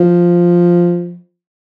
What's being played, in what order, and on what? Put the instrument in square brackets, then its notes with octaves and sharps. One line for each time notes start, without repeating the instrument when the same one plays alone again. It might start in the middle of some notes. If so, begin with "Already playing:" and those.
Already playing: [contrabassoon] F3